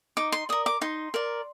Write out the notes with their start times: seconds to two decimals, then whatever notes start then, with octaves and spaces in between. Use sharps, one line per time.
0.17 D#4 D6
0.32 C6
0.49 A#4 D5 D#6
0.66 D6
0.81 D#4 C6
1.14 A#4 D5